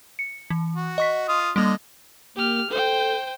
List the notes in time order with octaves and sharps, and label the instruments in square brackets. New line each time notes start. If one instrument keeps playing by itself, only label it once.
[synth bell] C#7
E3
[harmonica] F#4
[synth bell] D#5 C#6 B6
[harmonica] F4 D#6
[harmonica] D3 D#5 [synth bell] G3 A#3
[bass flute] A#3 [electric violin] G4 F6
[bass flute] A4 [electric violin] C5 G5